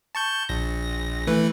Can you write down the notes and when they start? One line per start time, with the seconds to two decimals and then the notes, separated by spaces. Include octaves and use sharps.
0.15 A5 C#6 G6
0.49 A#1 A#6
1.27 E3 A3 B4